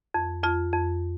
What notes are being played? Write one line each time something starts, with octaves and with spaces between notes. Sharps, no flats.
F2
F2 F4
F2